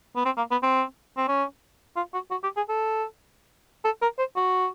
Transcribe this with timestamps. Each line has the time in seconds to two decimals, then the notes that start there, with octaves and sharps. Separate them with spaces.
0.16 B3
0.25 C4
0.37 A#3
0.51 B3
0.63 C4
1.17 C4
1.28 C#4
1.96 F4
2.14 F#4
2.31 F#4
2.43 G4
2.56 G#4
2.69 A4
3.84 A4
4.02 A#4
4.19 C5
4.36 F#4